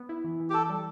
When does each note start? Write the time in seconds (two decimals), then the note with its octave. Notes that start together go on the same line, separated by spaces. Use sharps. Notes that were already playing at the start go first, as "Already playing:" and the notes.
Already playing: B3
0.09 E4
0.24 E3
0.40 E3
0.50 G4
0.54 E3 A4
0.69 G3